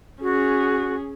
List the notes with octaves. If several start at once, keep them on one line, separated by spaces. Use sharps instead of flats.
C#4 F#4 G#4